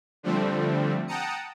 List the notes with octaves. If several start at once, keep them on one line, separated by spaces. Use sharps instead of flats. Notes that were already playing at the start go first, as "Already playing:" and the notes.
D3 F3 G3 A3 C4
F#5 G5 A5 A#5 D#6 C#7